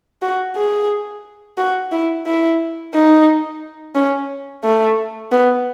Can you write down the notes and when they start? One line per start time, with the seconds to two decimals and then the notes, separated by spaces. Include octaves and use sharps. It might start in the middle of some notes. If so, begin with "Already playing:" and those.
0.22 F#4
0.56 G#4
1.58 F#4
1.92 E4
2.26 E4
2.94 D#4
3.95 C#4
4.64 A3
5.31 B3